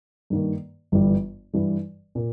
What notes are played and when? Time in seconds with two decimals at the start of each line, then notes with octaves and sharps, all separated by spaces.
0.30 G2 D#3 A#3
0.92 G1 G2 E3 G3
1.53 G2 E3 G3
2.15 A#2 A#3